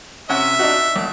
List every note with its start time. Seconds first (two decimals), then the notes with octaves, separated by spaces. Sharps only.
0.29 C3 C#4 E5 F#5
0.59 D4 D#4 F#4
0.96 B1